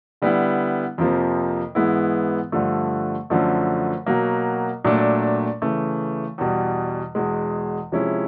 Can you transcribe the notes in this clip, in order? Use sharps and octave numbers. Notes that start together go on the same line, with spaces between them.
D3 G3 B3 E4
F2 C3 F3 A#3
G#2 E3 G#3 B3 E4
G2 D3 F3 A3
F#2 D3 F3 A3
B2 F#3 A#3
A#2 F#3 A3 D4
C#3 E3 A3
E2 B2 G3
E2 B2 G#3
C3 F3 G#3 C#4 E4